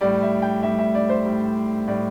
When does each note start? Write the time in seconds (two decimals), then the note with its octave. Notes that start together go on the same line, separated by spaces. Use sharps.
0.01 A2 G3 D5
0.22 E5
0.42 G5
0.63 A2 G3 E5
0.79 E5
0.95 D5
1.09 C5
1.25 A2 G3
1.87 A2 G3 D5